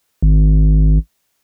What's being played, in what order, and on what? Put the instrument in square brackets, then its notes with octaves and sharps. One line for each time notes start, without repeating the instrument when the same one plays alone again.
[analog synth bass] G#1